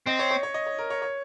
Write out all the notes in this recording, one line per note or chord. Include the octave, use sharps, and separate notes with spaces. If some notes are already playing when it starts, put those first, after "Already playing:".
C4 D#5
C#5
C#5
C#5
D#5
C#5
A#4
C#5
C#5